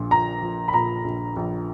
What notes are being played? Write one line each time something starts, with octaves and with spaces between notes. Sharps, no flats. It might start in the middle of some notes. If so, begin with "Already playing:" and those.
Already playing: A#1 A#2
A#1 A#5
F3
B5
A#2 A#5
A#1
A#1